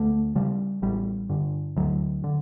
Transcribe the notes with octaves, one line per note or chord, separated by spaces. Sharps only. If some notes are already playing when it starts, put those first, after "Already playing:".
Already playing: D2 A3
C#3 G3
A1 G3
G2 D3
D2 F#3
D3